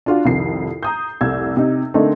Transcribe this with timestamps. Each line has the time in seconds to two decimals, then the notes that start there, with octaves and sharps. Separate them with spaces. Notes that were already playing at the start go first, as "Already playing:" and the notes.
0.06 D4 F4 F#4
0.25 C2 F2 D#3 C7
0.83 A#5 D#6 G6
1.21 F1 C2 E6 G#6
1.57 C3 D#4
1.94 D3 A3 A#3 C4 D4 D#4